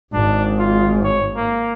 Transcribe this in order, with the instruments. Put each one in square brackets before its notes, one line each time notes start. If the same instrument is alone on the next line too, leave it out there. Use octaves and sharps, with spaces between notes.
[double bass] G#1 G#2 [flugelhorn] D4
[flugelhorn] F4
C#5
A#3